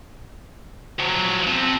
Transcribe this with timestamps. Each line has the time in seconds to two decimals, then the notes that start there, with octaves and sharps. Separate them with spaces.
0.99 F3 F#3
1.48 C4 A5